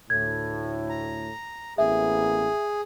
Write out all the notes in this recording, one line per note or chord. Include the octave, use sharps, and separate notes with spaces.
D2 A2 G#6
A#5
A1 A#3 B3 G#4 E5